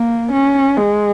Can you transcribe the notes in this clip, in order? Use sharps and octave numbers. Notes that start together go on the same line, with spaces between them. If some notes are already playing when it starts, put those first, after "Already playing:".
Already playing: A#3
C#4
G#3